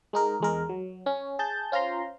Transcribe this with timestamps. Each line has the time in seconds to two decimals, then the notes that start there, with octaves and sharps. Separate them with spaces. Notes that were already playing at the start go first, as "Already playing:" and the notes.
0.13 G#3 D#4 A#4
0.40 E2 G#3 A#4
0.69 F#3
1.06 C#4
1.39 G#4 A5 G6
1.72 C#4 F4 C5 A#5 C6